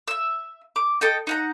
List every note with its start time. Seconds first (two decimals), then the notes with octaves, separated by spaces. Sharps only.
0.08 E5 E6
0.76 D6
1.01 A4 D#5 G5
1.27 D#4 F#5 A#5